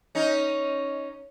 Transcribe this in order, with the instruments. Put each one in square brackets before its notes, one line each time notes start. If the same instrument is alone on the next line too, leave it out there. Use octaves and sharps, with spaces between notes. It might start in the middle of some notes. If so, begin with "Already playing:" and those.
[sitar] C#4 D#4